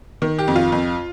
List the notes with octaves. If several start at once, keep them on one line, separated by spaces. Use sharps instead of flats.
D#3
G4
F2
F4
F2